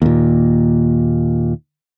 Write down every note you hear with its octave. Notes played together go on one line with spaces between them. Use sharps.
D#2 A#2